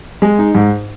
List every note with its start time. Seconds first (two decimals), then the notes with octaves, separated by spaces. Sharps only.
0.22 G#3
0.39 D#4
0.55 G#2